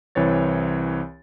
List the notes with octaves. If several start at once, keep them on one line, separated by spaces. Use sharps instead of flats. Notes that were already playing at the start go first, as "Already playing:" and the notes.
C2 E3 C4 C#5 A6